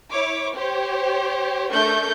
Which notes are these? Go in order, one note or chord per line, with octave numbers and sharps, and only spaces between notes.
E4 C#5 D6
G4 C5 C#5
A3 D4 A#4 C#6 G6